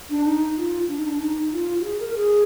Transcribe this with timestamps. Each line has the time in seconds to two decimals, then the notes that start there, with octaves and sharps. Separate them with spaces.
0.10 D4
0.25 D#4
0.57 F4
0.88 D4
0.97 D#4
1.06 D4
1.20 D#4
1.40 D#4
1.53 F4
1.79 F#4
1.84 G#4
2.00 A#4
2.15 G#4